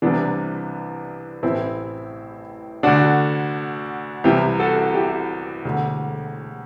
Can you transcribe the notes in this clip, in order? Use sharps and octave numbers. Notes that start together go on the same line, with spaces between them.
C2 C3 E3 B3 D4
A1 A2 E3 C4 E4
D2 D3 D4 F#4
C2 C3 E3 E4 G4
F#4 A4
E4 G4
E1 D2 D3